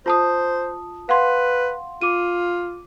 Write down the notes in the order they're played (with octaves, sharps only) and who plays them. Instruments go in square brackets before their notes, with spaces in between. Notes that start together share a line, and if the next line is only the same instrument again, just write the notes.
[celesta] F4 A5 D#6 [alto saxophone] C5
[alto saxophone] B4 [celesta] F5 F#5 C6
[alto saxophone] F4 [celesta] D6 D#7